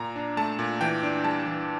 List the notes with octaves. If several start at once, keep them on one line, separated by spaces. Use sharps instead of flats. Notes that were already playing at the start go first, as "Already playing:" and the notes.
Already playing: A#2 A#5
D4
A3 A5
A#2
E3 G5
D4
G3 A5
E3